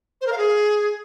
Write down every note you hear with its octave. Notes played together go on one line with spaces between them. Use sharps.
C5
A#4
F5
G#4